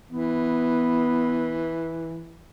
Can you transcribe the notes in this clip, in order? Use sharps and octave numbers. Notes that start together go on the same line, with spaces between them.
E3 B3